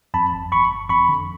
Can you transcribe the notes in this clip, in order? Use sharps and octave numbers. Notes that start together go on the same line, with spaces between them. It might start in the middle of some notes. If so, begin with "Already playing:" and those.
F2 A5 B5
G1
G1 B5 C#6
G1
F2 B5 C#6
D3